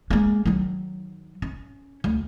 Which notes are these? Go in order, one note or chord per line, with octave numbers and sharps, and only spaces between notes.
G#3 A#3
D#3 F#3
C#4
D2